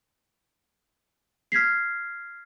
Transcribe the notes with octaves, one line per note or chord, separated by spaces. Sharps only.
F6 G#6 B6 C7